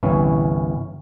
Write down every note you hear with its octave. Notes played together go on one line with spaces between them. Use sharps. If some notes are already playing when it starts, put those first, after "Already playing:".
G1 C2 E3 C#4